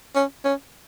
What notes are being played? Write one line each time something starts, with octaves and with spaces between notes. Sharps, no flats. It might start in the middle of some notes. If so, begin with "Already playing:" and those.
C#4
C#4